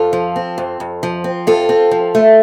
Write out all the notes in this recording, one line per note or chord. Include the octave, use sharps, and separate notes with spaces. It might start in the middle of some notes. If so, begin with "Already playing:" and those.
Already playing: F2 F4 A4
F3
C4
F2
F2
F3
C4
F2 F4 A4
C4
F3
A3